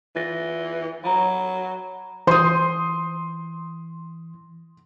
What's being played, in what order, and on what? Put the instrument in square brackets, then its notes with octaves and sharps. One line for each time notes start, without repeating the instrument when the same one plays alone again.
[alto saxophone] E3 [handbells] F4 A6 A#6
[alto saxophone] F#3 [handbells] A#5 B5
[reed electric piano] E3 [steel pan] C5 [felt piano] C6 D#6